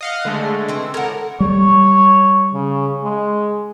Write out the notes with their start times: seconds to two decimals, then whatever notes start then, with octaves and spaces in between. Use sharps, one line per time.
0.01 D#5 F5 F#5
0.25 D3 G#3 A3
0.68 E3 C4
0.94 A2 A#4 F#5
1.40 G3 C#5
2.53 C#3
3.04 G#3